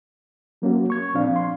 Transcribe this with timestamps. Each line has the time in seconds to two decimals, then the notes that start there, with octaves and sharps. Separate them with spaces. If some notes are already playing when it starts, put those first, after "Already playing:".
0.62 F#3 A#3 C#4 F#4
0.90 C#6 G#6
1.14 A#2 F3 C4 D4 F5
1.36 C6